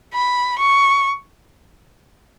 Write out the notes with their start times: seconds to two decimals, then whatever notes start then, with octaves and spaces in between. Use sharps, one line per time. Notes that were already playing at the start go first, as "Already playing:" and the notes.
0.14 B5
0.59 C#6